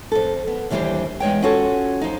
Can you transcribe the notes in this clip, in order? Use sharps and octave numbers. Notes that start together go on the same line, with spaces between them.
F2 A4
B3
D#2 E3 G3 D4 G4 C5
E2 G#3 C#5 G5
C#4 F4 F#4 A4 C#5
F3 D#4